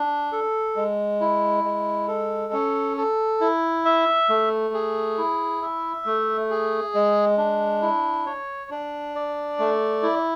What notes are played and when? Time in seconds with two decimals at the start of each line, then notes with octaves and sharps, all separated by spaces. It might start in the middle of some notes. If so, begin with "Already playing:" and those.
Already playing: D4
0.32 A4
0.76 G#3
1.20 E4
1.64 G#3
2.08 A4
2.53 C#4
2.97 A4
3.41 E4
3.85 E5
4.29 A3
4.74 G#4
5.18 E4
5.62 E5
6.05 A3
6.50 G#4
6.94 G#3
7.38 D4
7.82 E4
8.26 C#5
8.70 D4
9.15 D5
9.59 A3
10.03 E4